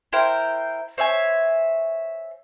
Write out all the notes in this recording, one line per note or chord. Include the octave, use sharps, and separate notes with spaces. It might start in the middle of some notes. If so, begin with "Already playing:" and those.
E4 A#4 C5 G5
C5 C#5 E5 G#5